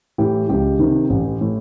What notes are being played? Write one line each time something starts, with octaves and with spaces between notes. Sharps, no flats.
A2 E3 G4
C#2 G4
C3 D#3
A1
A2